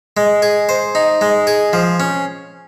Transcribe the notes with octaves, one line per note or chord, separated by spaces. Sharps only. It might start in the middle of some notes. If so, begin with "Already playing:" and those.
G#3
G#4
C5
D#4
G#3
G#4
F3
C#4